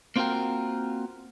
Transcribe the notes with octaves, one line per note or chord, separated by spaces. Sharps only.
A#3 C4 F4 F#4 A#4 G5